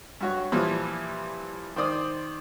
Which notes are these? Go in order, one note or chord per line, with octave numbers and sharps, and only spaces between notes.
G2 F#4 C#5
A#2 E3 F3 G3
D#3 C5 D5 D#6